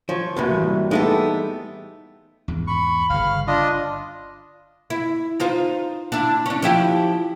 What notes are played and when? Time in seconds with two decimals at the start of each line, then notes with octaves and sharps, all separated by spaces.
0.09 F3 C#5
0.37 F#2 A2 C3 A#3 B4
0.51 E3 G3
0.91 G#3 A3 B3 D#4 G4 A4
2.48 E2 G#2
2.67 B5 C#6
3.10 G1 C#3 F5
3.47 D4 F4 D#5
4.90 E4
5.40 D#4 F4 C5
6.12 D4 E4
6.46 C#4 D4
6.62 F3 E4 G4